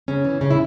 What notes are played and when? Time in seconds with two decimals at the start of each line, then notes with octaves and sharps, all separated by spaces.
0.08 C#3 C#4
0.25 E3
0.41 C#3 C#4
0.51 E4